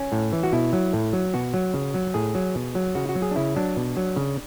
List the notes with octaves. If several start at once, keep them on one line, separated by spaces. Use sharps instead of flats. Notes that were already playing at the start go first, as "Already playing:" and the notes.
Already playing: C#4
A2
E3
F#4
B2 E4
F#3
A2
F#3
B2 F#4
F#3
C#3
F#3
A2 G#4
F#3
B2
F#3
C#3 F#4
F#4
F#3
G#4
D4
C#3 E4
F#3 D4
B2
F#3
C#3